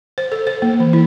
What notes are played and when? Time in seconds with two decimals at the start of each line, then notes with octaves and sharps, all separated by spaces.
0.18 C5
0.32 A4
0.47 C5
0.62 A#3
0.80 E3
0.93 E4